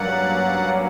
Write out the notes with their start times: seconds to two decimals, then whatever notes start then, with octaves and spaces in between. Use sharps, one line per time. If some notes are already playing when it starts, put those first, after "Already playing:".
Already playing: G2 F#3 A#3 C#4 D5 F#5